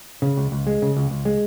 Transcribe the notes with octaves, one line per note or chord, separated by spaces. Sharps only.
C#3
C#2
C#2
G#3
C#3
C#2
C#2
G#3